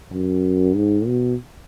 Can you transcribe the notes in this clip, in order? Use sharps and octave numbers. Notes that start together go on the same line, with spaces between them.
F#2
G#2
B2